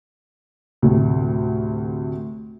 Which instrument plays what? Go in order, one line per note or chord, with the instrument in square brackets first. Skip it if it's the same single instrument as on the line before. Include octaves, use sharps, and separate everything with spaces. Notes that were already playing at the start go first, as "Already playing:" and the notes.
[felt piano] D2 A2 C3